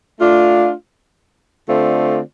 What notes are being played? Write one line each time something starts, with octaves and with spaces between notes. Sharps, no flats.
A3 D4 F4
D3 A3 C4 F4 D5